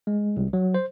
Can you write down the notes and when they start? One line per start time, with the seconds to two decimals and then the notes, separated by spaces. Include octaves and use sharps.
0.07 G#3
0.37 C2
0.53 F#3
0.74 C5